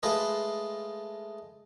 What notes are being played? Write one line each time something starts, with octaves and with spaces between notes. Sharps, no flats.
G#3 A3 F4 A4 B4 D#5